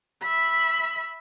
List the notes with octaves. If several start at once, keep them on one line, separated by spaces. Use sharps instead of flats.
E5 B5